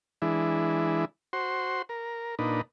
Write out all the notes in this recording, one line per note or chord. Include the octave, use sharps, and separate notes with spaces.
E3 G#3 D4 E4
F#4 C5 C6
A#4
A#2 D4 D#4 B4